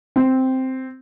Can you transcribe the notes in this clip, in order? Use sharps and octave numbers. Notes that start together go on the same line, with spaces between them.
C4